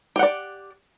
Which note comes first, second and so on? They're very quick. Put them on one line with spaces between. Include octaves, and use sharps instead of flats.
G4 F#5 D5